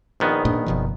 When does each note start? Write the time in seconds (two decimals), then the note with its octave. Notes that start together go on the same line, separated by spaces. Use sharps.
0.20 A#1 D#3 B3
0.45 A#2 A#3 D4
0.66 F#1 B2 F3